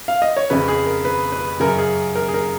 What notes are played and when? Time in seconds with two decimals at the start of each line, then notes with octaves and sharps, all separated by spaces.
0.08 F5
0.22 D#5
0.37 C#5
0.50 F2 C#3 B4
0.68 G#4
0.86 A#4
1.05 B4
1.32 B4
1.60 F#2 C#3 A#4
1.78 G#4
2.15 A#4
2.28 G#4
2.34 A#4